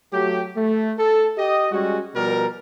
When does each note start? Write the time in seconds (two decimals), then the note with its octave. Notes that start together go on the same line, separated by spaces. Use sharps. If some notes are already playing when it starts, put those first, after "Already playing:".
0.13 F#3 A3 G4
0.57 A3
0.98 A4
1.38 G4 D#5
1.72 G3 G#3 C#4 F#4
2.16 B2 F3 G3 A#4